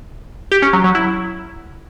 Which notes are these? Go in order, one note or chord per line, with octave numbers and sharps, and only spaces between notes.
G4
C#4
F#3
F#3
E4